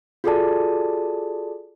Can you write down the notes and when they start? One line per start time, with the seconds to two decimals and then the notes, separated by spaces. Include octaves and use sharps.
0.24 F4 F#4 G#4 A4 D5 A5